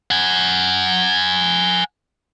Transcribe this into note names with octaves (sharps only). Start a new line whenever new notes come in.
F#5 G#5